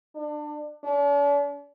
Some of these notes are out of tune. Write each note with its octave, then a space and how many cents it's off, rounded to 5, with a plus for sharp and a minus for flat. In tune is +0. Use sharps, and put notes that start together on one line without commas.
D4 +25
D4 -45